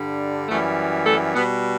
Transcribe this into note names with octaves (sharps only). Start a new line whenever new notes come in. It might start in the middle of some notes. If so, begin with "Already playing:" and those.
Already playing: G2 D3 G3
F#2 E3 G3 A3
A3 A4
B2 G3 B3